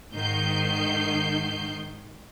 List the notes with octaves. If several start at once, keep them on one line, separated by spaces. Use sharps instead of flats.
G#2 D#3 G6 C7